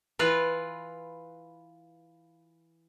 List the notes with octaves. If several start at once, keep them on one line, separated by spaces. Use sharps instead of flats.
E3 F4 B4